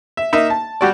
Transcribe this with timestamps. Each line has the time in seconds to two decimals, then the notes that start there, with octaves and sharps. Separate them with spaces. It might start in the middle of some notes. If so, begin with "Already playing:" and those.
0.17 E5
0.33 A#3 D#4 E5
0.50 A5
0.81 G3 F#4 D5